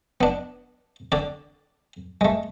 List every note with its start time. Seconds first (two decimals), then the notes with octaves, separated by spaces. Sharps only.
0.21 B3 D4
1.12 D3 D5
2.21 G#3 A3